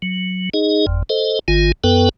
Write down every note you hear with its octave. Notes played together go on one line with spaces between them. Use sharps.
F#3
D#4 G#4 D#5
G1 F2
A4 C5 D#5
G#1 D#3 F4 G#5
F#2 B3 A4 B4 G5